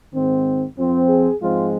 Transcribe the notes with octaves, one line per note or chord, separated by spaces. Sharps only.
G#2 D#3 C4
F2 F3 C4
G#4
G#2 F3 G#3 C4 F4